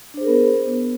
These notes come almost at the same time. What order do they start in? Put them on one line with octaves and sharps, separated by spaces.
D4 C5 G#4 A#4 B3